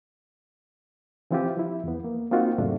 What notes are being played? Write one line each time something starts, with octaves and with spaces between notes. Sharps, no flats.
E3 F3 C4 E4 F4 G4
F3 E4
E2 B3
A#3
A#3 C4 D#4 F4 F#4
E2 G#2 C3 F#3 A3 D4